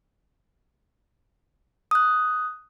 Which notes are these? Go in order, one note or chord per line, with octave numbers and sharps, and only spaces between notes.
D#6 F#6